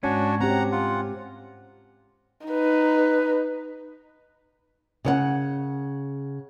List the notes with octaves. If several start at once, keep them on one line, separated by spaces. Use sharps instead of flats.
G#2 C#4 D4 F#4
C4 G4 F#5 A#5
F4 F#5
D#4 B4
C#3 C#5 F#5